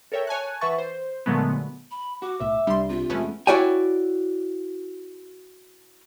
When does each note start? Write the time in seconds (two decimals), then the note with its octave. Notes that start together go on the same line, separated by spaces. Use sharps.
0.12 A4 A#4 C#5 E5 G5
0.27 C#5 G#5 A5 F#6
0.61 E3 B4 E5 F#5 C#6 A6
0.78 C5
1.26 A#2 D3 F#3 G#3 A3 B3
1.91 B5
2.22 F#4 D6
2.40 B1 A2 E5
2.67 C2 G3 D4 C6
2.90 C3 F4
3.10 E2 G#3 A3 B3 C#4
3.47 E4 F#4 C#5 D5 G5 G#5